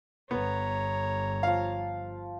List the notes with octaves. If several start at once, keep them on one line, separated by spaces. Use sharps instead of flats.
G1 B3 C#5 A#5
F3 F4 F5